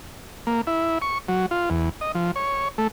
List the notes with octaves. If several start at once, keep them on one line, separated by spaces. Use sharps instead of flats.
A#3
E4
C#6
F#3
F4
E2
D#5
F3
C#5
A3